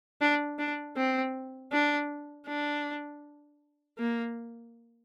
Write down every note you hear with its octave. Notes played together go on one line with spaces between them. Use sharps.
D4
D4
C4
D4
D4
A#3